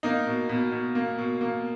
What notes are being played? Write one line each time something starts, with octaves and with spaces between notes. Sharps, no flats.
A#3 D#4
B2
B2
B2
A#3
B2
A#3